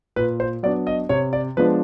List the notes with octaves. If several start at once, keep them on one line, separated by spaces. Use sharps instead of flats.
A#2 B4
C5
F#3 B3 D4 D5
D#5
C3 C#5
D5
F3 G#3 B3 D4 B4